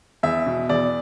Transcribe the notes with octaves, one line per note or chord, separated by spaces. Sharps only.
E2 E5
B2
E2 D5